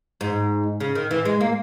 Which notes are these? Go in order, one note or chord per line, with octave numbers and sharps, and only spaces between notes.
G#2
C#3
D#3
E3
G#3
A#3